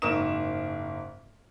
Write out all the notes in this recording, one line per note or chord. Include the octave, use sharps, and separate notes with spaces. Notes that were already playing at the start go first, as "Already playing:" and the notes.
F#1 G#2 A#4 C#6 D#6 E7